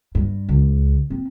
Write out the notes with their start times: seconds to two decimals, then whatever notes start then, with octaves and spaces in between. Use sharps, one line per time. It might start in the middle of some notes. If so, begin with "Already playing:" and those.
0.15 G2
0.49 C#2
1.10 C4